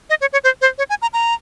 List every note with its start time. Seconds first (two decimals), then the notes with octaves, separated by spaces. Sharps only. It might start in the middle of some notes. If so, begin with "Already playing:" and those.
0.10 D#5
0.21 C#5
0.33 C#5
0.44 C5
0.61 C5
0.78 C#5
0.90 G#5
1.02 A#5
1.13 A#5